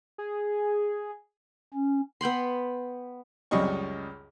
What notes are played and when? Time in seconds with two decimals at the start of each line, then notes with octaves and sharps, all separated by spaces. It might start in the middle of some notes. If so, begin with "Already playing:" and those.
0.18 G#4
1.74 C#4
2.21 B3 G5 B5 C6
3.51 C#2 F#2 G3 D#5 C#6